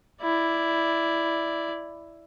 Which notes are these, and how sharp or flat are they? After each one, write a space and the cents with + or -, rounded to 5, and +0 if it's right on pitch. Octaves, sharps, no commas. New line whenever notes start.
E4 +5 D5 +0